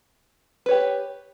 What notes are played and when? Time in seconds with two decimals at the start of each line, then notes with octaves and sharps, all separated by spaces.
0.66 B4
0.69 C#5
0.71 G4